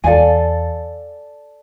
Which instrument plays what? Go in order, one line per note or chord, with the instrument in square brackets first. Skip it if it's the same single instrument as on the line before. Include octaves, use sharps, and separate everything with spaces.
[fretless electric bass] E2 [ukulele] A4 D5 F5 G#5